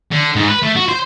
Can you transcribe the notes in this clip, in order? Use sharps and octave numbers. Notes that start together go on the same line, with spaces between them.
D3
G#2
B4
A3
F#4
C5